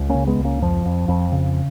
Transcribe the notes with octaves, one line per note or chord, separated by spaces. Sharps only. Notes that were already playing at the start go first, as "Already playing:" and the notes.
Already playing: C#2
A#3 C#4
C#3
G#3 B3
C#2
A#3 C#4
F2 F3
F2
F2
C#3